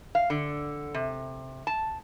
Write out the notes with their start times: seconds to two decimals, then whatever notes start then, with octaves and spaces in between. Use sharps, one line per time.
0.15 F5
0.30 D3
0.94 C3
1.67 A5